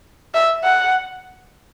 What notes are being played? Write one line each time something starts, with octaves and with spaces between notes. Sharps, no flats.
E5
F#5